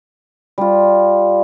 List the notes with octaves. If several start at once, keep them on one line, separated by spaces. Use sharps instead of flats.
G3 F4